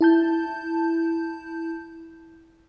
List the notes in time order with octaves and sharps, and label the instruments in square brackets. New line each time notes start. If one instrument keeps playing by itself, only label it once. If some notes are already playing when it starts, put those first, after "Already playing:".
[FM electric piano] E4 A5 G6